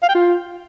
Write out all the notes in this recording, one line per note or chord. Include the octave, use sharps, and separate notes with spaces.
F5
G5
F4